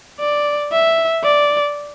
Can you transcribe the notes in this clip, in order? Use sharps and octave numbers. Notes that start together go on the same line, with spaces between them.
D5
E5
D5